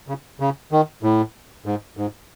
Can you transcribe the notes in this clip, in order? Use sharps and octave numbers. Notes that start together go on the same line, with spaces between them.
C#3
C#3
D#3
A2
G#2
G#2